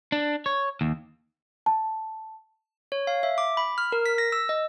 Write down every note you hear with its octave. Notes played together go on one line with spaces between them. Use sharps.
D4
C#5
D#2
A5
C#5
F5
E5
D6
B5
F6
A#4
B6
A#6
E6
D#5